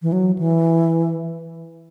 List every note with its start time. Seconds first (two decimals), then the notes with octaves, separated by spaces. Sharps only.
0.02 E3
0.12 F#3
0.39 E3